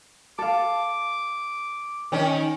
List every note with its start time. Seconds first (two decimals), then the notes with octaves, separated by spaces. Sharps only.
0.39 A4 F5 D6
2.12 D#3 C#4